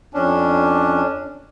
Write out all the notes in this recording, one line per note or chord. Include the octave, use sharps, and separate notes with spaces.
F2 C#4 D4